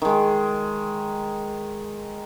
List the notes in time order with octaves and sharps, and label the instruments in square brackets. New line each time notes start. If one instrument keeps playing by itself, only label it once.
[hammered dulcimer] D#3 G#3